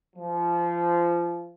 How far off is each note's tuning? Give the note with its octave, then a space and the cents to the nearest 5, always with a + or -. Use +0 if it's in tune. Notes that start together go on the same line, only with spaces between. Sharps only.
F3 -20